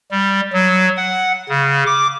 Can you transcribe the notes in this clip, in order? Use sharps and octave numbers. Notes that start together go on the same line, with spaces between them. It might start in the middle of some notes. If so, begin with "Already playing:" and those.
G3
F#3
F#5
C#3
D6